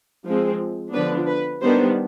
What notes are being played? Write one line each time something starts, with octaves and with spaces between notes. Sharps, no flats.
F3 G#3 C4
D3 F3 B3 D4 B4
B4
D#3 G3 B3 D4 C5